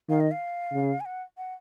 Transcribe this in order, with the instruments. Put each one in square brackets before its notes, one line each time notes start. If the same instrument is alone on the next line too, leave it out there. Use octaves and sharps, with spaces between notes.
[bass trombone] D#3 [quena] F5
[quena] D#5
F5
[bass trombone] C#3
[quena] G#5
F#5
F#5